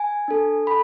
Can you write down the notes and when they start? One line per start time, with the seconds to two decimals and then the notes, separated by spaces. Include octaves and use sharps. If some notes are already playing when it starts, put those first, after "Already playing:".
Already playing: G#5
0.28 D4 A4
0.67 A4 B5